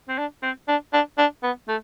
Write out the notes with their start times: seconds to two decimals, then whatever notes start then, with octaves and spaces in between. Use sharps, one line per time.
0.09 C4
0.18 D4
0.43 C4
0.68 D4
0.93 D4
1.18 D4
1.43 B3
1.68 A3